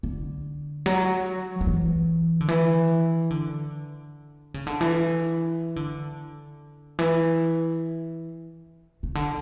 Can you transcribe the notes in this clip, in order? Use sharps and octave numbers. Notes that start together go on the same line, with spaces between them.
D3
F#3
F#3
E3
D3
E3
D3
C#3
D3
E3
D3
E3
C#3
D3